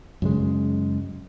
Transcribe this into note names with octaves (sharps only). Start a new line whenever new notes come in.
F#2 C#3 G#3